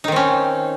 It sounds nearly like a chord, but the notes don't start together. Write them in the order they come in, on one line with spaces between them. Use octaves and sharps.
D#4 D#3 C4 C#4